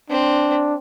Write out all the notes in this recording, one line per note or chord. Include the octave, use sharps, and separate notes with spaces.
C4 D4